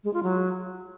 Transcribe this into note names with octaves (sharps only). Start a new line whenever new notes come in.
G#3
F4
F#3